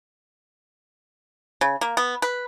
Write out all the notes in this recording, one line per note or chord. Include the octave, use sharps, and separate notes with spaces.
C#3
A#3
B3
B4